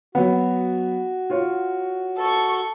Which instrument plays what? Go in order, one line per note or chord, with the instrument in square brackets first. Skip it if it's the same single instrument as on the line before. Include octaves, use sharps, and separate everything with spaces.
[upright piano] F#3 B3 [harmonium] F#4
[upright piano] F4 C#5 F#5
[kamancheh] A4 C#6